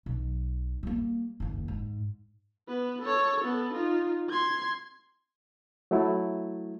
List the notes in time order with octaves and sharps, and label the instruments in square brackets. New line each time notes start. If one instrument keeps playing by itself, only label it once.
[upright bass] B1
G3 A#3
F#1 D#2
G#2
[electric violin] B3 B4
A4 C#5
B3 A4
D#4 F4
C6 G#6
[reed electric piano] F#3 A3 E4